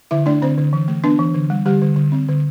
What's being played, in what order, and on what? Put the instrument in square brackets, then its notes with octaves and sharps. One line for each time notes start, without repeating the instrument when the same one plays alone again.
[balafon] D3 E4 E5
A3 D4 D5
D3 C4 C5
D3
E3
A3
B3 D4 B4
E3
D3
G3
D3 G3 G4
D3
D3
C4
D3